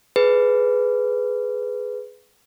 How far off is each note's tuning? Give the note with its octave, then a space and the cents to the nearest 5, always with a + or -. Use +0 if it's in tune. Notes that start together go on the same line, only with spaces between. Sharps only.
G#4 +15 B4 +10